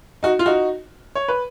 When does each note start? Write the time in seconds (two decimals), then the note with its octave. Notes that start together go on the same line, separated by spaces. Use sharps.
0.23 D#4 F#4
0.39 F4
0.46 D#4 F#4
1.15 C#5
1.28 B4